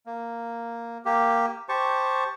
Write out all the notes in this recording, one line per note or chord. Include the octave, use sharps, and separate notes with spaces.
A#3
A#3 G4
G4 C5 A5 C#6